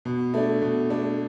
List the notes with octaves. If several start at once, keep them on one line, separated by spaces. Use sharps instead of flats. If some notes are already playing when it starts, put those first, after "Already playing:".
B2
A3 D4
B2
A3 D4